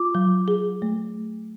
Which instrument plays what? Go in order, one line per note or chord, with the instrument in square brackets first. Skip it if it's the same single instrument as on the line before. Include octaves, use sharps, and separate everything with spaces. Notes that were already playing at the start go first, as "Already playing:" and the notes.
Already playing: [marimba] F4 [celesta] D6
[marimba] F#3
G#4
A3